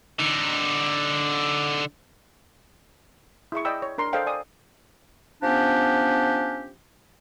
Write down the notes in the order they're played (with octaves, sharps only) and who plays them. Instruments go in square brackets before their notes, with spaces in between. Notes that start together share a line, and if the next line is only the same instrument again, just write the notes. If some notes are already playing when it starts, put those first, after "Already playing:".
[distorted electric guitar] D3 D#4
[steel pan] E4 G#4 E5 C#6
D5 D#5 G5 B5 E6
C#5
D4 A#4 A#5 C6
A4 C5 D5 D#5 F5 G5
D5 G#5 D#6
[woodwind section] F3 B3 C#4 D4 G4